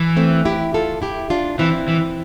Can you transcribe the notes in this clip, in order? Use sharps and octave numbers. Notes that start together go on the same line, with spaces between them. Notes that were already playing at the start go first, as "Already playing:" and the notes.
Already playing: E3
A3 C4
E4 G4
F4 A4
E4 G4
D4 F4
E3 C4 E4
E3